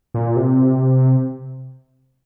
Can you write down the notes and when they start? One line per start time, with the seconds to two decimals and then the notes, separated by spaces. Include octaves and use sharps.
0.14 A#2
0.36 C3